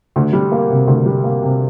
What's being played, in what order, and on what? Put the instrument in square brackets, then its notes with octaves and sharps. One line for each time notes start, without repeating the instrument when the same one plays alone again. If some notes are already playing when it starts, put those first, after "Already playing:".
[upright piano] D2
G3
A#3
C3
D2
G3
A#3
C3